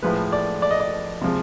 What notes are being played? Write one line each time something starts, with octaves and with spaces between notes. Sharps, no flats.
A2 F3 G#3 B4
D5
D5
D#5
D5
C3 F3 G#3